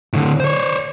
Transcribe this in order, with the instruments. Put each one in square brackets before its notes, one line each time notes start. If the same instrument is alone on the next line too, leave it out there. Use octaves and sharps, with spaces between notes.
[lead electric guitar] A2 D3
C5 C#5